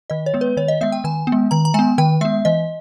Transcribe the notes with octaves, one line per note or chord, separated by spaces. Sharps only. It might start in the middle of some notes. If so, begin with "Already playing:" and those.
D#3 D#5
C#5
G#3 B3
B4
D#3 C#5
D#5
G#3 B3 E5
G5
D#3 G#5
B3
G#3
D#3 A#5
A#5
G#3 B3 G#5
D#3 G5
G#3 B3 E5
E3 D#5